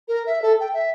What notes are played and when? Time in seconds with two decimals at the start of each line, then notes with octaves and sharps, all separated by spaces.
0.08 A#4
0.26 E5
0.42 A4
0.60 G5
0.73 E5